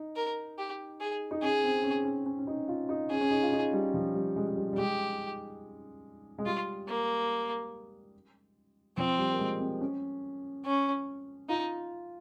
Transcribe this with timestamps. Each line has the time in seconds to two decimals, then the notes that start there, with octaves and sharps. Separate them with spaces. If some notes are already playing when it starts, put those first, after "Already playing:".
Already playing: D#4
0.16 A#4
0.58 G4
1.00 G#4
1.31 D#4
1.42 C#4 G#4
1.64 C4
1.84 C#4
2.05 C#4
2.26 C#4
2.39 C#4
2.47 D#4
2.68 F4
2.89 D#4
3.11 C#4 G#4
3.21 C#4
3.30 D#4
3.43 F4
3.52 D#4
3.73 G3
3.94 F3
4.14 G3
4.36 G#3
4.48 G#3
4.57 G3
4.73 G3
4.78 G#3 G4
6.38 G#3
6.46 G3 F4
6.88 A#3
8.97 F3 C4
9.18 G3
9.33 A#3
9.39 G#3
9.60 C4
9.81 C#4
10.65 C#4
11.49 D#4 F4